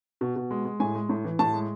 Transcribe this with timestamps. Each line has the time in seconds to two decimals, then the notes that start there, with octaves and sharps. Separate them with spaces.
0.21 B2
0.36 B2
0.51 G#3
0.65 G#3
0.80 A2 G#5
0.95 G#3
1.09 A2
1.25 E3
1.39 A2 A5
1.53 G#3